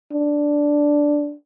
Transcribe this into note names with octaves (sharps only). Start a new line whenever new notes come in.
D4